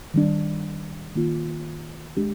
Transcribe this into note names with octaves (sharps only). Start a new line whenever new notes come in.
D#3 G3 D4
D#3 A#3 F4
G#3 D4 G4